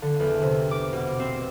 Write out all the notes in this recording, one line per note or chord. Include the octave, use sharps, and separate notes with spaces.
D3
E2
C3
D6
B2
C4